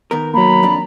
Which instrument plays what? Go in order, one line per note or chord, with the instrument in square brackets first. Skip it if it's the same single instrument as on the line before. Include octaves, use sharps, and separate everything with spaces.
[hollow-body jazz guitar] D#3 B3 A#4 [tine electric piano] A#5
[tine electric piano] F#3 A#3 [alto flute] A#5 [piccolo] B5
[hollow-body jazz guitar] F2 D4